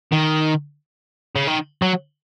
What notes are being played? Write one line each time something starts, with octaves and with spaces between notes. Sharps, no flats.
D#3
C#3
D#3
F#3